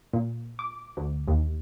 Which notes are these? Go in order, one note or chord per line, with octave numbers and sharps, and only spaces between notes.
A#2
D6
D2
D#2